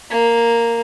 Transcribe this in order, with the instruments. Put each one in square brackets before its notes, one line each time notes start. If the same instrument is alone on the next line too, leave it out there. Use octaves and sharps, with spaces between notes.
[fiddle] A#3